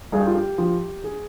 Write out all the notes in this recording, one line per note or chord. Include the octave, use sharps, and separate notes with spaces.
G2 G#4
G4
F4
G4
F3
G#4